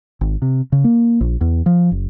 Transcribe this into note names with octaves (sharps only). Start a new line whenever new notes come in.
G#1
C3
C#3
A#3
A#1
E2
F3
F#1